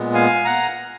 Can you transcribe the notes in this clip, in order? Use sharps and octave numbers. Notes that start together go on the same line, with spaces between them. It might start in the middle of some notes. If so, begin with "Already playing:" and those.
Already playing: A#2 G#3 B3
F5 G#5
F#5 A#5